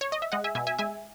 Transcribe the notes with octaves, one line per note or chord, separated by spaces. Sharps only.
C#5
D#5
E5
G#3 D#5 F#5
E5 G#5
B2 E5 G#5
E5 G#5
G#3 E5 G#5